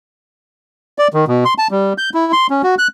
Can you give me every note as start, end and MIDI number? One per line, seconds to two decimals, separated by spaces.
0.99 1.08 74
1.14 1.25 51
1.28 1.44 47
1.45 1.54 84
1.58 1.68 81
1.71 1.93 55
1.98 2.10 91
2.14 2.32 64
2.32 2.47 84
2.50 2.62 61
2.63 2.75 66
2.78 2.88 90